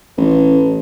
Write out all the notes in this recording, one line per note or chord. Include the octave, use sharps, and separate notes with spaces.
A1